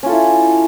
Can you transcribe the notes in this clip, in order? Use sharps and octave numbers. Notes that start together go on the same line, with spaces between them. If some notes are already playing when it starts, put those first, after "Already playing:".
C#4 E4 F4 A4